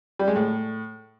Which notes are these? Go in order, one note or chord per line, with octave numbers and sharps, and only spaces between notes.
G3
G#3
A2